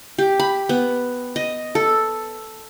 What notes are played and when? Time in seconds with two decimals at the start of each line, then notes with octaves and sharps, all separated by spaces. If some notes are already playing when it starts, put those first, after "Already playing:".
0.18 G4
0.39 B5
0.69 B3
1.36 D#5
1.75 A4